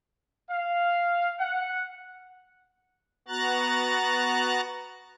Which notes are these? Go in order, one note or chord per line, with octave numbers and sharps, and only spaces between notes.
F5
F#5
B3 F#4 A#5 F#6 A6